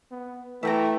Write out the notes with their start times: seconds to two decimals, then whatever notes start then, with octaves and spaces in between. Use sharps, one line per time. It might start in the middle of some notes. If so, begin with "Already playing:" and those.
0.11 B3
0.63 E3 A3 E5 G5 A#5